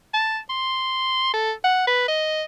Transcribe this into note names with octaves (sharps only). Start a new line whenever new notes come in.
A5
C6
A4
F#5
B4
D#5